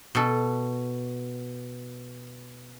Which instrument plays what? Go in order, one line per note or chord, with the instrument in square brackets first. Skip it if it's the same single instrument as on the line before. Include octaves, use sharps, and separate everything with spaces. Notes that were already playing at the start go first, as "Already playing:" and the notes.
[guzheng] B2 A4